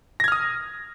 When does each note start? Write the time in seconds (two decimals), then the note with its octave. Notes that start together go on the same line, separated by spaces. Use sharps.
0.20 A#6
0.24 G#6
0.28 F6
0.32 D#6